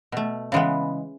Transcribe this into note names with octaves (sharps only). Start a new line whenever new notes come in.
B2 A3
C#3 E3 G#3 B3